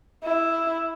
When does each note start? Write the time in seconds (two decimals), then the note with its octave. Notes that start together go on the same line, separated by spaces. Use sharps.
0.24 E4